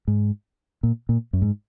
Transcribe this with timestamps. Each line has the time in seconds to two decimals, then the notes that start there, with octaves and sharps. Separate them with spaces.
0.08 G#2
0.83 A#2
1.09 A#2
1.33 F#2
1.42 G#2